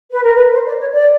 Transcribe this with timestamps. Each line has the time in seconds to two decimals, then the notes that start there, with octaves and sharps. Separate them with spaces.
0.11 B4
0.24 A#4
0.35 B4
0.53 C5
0.66 D5
0.80 C#5
0.94 D5